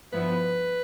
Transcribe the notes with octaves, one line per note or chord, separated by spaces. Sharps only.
G2 F3 B3 E4 B4